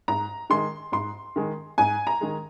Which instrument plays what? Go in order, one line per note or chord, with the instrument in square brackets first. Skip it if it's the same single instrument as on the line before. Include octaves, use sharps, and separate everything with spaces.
[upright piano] G#2 A#5
D#3 G#3 C6
G#2 C6
D#3 G#3
G#2 G#5
A#5
D#3 G#3